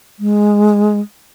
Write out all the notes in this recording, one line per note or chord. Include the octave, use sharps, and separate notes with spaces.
G#3